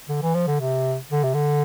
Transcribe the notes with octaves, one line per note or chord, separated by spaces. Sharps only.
D3
E3
F3
D3
C3
D3
C3
D3